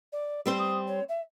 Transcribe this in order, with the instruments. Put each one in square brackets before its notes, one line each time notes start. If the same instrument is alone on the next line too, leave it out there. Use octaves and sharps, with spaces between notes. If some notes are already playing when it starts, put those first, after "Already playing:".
[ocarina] D5
[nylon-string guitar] G3 C4 C5 [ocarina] E6
[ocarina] D#6
C#5
E5